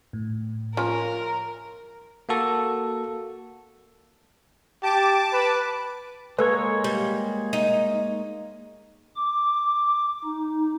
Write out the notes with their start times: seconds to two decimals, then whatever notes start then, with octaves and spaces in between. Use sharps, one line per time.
0.13 A2
0.77 F3 A#3 C#4 A#4
2.29 A#3 F#4 A4
4.83 G4 A5 D6
5.33 B4
6.39 G#3 A#3 A4 B4 C#5
6.84 G3
7.53 D#4
9.15 D6
10.24 D#4